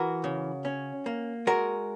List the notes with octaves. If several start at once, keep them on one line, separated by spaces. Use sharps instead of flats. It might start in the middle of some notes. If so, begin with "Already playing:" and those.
Already playing: E3 F#4 A#4
C#3
C#4
A#3
G#3 F#4 A#4